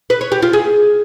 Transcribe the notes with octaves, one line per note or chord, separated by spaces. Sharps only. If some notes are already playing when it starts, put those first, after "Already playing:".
B4
C#5
G4
F4
G#4